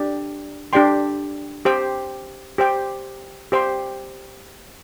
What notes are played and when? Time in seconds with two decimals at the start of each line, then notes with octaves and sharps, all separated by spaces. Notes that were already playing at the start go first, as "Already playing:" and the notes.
Already playing: D4 G4 D5
0.73 D4 G4 D5 G5 C6
1.65 G4 C5 G5
2.58 G4 C5 G5
3.52 G4 C5 G5 C6